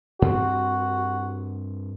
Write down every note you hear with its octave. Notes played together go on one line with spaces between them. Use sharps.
G2 C4 F#4